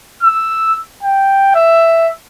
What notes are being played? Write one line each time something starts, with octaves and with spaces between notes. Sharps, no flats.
E6
G5
E5